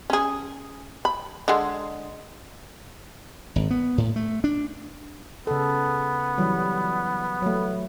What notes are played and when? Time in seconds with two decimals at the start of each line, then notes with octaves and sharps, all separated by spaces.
0.10 C#4 G#4
1.05 B5
1.48 D3 G#3
3.56 G#1
3.71 B3
3.98 A2
4.16 A3
4.44 D4
5.47 C#3 B3 A4
6.38 E3 F#3 G3
7.42 F#3 A3